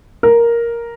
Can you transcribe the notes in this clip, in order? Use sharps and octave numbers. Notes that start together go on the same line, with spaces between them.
A#4